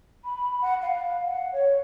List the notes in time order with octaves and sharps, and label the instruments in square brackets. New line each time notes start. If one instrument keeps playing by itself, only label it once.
[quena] B5
F#5
F5
F#5
C#5